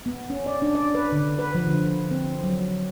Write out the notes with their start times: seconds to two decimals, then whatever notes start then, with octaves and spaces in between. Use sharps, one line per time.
0.06 B3
0.30 C#4
0.46 D5
0.62 D4
0.75 D5
0.95 B4
1.12 D3
1.39 B4
1.55 F3
1.67 D3
2.11 C4
2.44 F#3